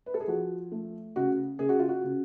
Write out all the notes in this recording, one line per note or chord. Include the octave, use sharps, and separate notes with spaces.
B4
A4
G#4
F3 F#4
A3
C#3 F#4
C#3 G#4
F#4
F4
F#4
C#3